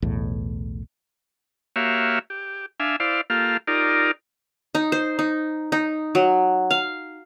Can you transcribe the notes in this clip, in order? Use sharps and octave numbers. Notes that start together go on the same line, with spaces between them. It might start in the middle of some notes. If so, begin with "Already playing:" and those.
B1 E2 A2
A#3 F#4 G4 C#5 E5 F5
G4
D4 E5 F5 G#5
E4 C5 D5 F5
A#3 F4 G4 A4 F5
D#4 F4 G4 A#4 D5
D#4
C5
D#4
D#4
F#3
F5